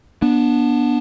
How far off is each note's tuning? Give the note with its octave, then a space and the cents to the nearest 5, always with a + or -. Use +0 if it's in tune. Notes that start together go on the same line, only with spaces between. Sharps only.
B3 -25 D4 +0